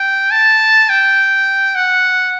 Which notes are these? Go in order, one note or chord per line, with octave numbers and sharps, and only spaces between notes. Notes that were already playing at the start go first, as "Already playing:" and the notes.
Already playing: G5
A5
G5
F#5